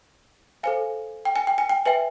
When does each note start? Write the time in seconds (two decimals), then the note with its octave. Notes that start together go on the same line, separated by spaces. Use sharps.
0.63 A4 C5 F5 G#5
1.25 G5
1.36 G#5
1.47 G5
1.58 G#5
1.69 G5
1.86 B4 E5 G5 G#5